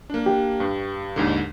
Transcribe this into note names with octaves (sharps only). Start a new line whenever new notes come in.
A#3 D4
G4
G2
D#2 G#2 D3